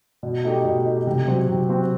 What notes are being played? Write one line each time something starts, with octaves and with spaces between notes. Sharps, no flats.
B2
A3 D#4 G4
B2
A3 D#4 G4
C3
F#3 C4 F#4 C5
C3
F#3 C4 F#4 C5